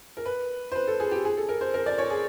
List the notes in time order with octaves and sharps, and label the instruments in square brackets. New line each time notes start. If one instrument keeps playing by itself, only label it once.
[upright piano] A#4
B4
C5
B4
A4
G#4
G4
G#4
A4
A#4
C5
A#4
D5
C#5
G#4